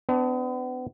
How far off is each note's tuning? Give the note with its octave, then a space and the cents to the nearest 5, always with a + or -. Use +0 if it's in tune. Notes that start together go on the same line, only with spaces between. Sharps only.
B3 +40 D4 +0